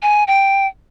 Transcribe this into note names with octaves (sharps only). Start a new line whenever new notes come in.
G#5
G5